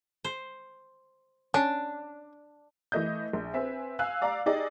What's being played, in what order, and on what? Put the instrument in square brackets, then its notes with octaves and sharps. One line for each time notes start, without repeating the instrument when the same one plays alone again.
[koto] C5
[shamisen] C#4 [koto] D4
[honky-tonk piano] E3 A3 D#5 G6
A#1
C4 B4 E5 G#5
F5 G#5 E6 F#6
D5 F5 A#5 D6
D#4 G4 G#4 D5 D#5